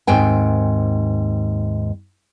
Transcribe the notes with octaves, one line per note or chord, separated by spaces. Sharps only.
D#2 G#2 C4 G5 G#5